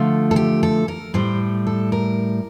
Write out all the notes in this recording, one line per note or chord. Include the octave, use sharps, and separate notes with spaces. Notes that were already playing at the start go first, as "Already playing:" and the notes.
Already playing: D3 F3 A3 F4
A4
G4
A4
A#4
A2 G3 C5
A4
A#4